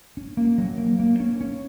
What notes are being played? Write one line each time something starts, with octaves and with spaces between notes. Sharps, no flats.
C#4
A#3
F#3
A#3
A#3
C#4
C#4